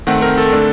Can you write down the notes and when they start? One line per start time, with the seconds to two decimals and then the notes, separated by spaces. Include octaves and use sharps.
0.07 D#3 A3 C4 F#5
0.22 A#4
0.38 A4
0.52 D3 A3 D4